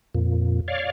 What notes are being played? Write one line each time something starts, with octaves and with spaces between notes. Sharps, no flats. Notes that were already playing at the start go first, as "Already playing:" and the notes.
F2 A#2
C#5 D5 F5